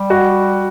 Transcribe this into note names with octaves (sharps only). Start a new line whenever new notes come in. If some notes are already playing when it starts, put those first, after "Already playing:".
Already playing: G3
F#4